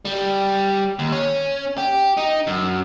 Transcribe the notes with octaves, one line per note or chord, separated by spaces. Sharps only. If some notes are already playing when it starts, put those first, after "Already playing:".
G3
D#2
C#4
G4
D#4
F#2